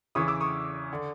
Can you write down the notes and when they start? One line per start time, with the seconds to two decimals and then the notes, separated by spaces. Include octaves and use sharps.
0.15 E2 C#3 E3 C#6 D#6
0.28 D6 E6
0.41 C#6 D#6
0.93 D3